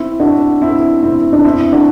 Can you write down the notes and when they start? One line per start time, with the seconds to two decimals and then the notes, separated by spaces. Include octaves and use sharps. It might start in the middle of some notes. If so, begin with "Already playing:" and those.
Already playing: C4 E4
0.20 D4 F#4
0.61 C4 E4
1.03 C4 E4
1.33 D4
1.44 C4 E4
1.72 D4 F#4